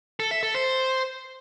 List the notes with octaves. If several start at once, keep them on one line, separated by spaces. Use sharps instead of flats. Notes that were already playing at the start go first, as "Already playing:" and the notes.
A4
E5
A4
C5